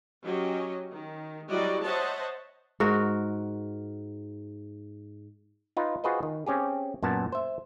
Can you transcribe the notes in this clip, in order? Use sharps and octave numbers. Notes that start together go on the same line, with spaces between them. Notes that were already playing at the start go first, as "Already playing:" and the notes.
F#3 C#4 G4 D#5
D#3
F#3 G3 E4 F#4 D5 D#5
C5 C#5 D#5 E5 F#5 A5
G#2 F#4 A#4
D#4 F4 B4
F4 F#4 G#4 B4 C5 D#5
D#3
C4 C#4 G4 G#4
F#2 A#2 B3 A5
C5 E5